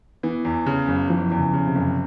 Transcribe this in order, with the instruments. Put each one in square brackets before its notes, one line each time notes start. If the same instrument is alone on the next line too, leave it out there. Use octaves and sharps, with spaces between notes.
[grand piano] E3 [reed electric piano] B3
[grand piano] E2
C#3
F#1
[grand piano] E3 [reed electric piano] F3
[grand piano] E2
[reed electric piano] C#3
[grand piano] C#3
[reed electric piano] C3
[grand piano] F#1